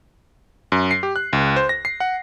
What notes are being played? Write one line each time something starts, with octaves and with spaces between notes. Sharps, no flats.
F#2
C7
G4
F#6
C#2
C5
A#6
C7
F#5